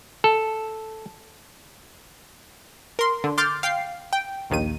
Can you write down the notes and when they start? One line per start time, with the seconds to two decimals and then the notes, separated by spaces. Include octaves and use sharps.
0.24 A4
2.99 A#4 C6
3.24 D3
3.38 C6 D6 F6 G6 A6
3.63 F5 G5 C7
4.13 G5
4.50 A#1 D#2 D#3 D#7